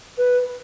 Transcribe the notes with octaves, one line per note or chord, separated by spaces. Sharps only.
B4